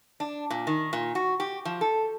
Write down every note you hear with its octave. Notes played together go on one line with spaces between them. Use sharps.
D4
A#2
D#3
A#2
F#4
G4
F3
A4